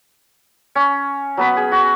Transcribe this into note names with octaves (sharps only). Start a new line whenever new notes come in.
C#4
F#3 B3 B5
G#4
F#4